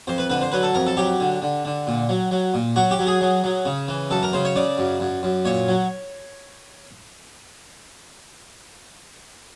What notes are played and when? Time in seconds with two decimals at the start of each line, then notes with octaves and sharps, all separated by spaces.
0.07 F2 C5
0.18 B4
0.30 D3 B4
0.42 C5
0.52 F#3 B4
0.63 A4
0.74 F2 A#4
0.87 A4
0.97 F#3 G4
1.20 D3
1.42 D3
1.65 D3
1.87 A#2
2.09 F#3
2.31 F#3
2.54 A#2
2.76 F#3 F#4
2.91 G4
2.99 F#3
3.07 G#4
3.21 F#3
3.44 F#3
3.66 C#3
3.88 E3
4.10 F#2 A4
4.23 A#4
4.33 C#3 C5
4.45 C#5
4.56 C#3 D5
4.78 F#2
5.00 F#2
5.23 F#2
5.45 A#2 C#5
5.68 F#3